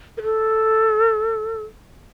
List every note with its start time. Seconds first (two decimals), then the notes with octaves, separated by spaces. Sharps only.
0.18 A#4
0.22 A4